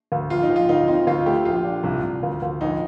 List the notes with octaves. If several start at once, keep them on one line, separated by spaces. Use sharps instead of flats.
D2
A#1 F4
D#4
A#1
F4
D2 D#4
C4 D#4
D2 F4
A3 G4
A#1 F4
D4
C2
C2
D2
D2
A#1 D#4